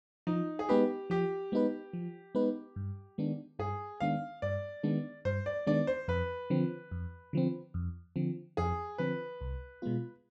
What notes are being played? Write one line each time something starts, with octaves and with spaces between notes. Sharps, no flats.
F3 D#4
G#4
G#3 B3 D#4 G4 B4
F3 G4
G#3 B3 D#4 B4
F3
G#3 B3 D#4 B4
G2
D#3 G#3 B3 D4
G2 G#4
D#3 G#3 B3 D4 F5
G2 D5
D#3 G#3 B3 D4
G2 C5
D5
D#3 G#3 B3 D4 D5
C5
F2 B4
D3 F3 C4
F2
D3 F3 C4
F2
D3 F3 C4
F2 G#4
D3 F3 C4 B4
C2
B2 G#3 B3 F4